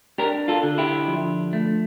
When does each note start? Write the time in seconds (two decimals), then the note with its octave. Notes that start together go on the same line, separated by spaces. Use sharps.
0.18 D4 G4 A#4
0.48 F4 A4
0.63 D3
0.78 E4 G4
1.08 F3
1.53 A3